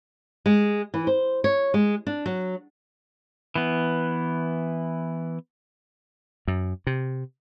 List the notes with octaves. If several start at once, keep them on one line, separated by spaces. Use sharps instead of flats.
G#3
E3
C5
C#5
G#3
D4
F#3
E3 B3
F#2
C3